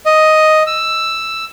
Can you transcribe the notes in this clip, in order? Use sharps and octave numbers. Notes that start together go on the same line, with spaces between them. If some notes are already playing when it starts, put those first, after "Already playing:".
D#5
E6